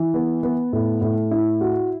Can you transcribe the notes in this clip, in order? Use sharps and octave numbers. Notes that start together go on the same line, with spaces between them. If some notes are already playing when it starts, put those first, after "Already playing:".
Already playing: E3
B3
B3
A2
A2
E4
F#4